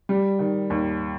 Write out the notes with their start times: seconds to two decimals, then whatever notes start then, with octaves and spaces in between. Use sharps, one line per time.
0.09 G3
0.39 D#3
0.70 D#2